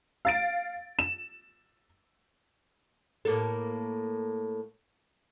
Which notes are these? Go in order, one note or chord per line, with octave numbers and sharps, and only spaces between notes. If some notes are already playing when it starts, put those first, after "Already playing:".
F5 A6 D7
E7
A2 A#3 A4